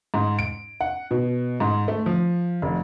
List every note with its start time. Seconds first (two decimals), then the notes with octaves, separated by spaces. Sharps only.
0.14 G#2
0.39 D7
0.81 F#5
1.11 B2
1.60 G#2
1.88 A3
2.06 F3
2.62 F1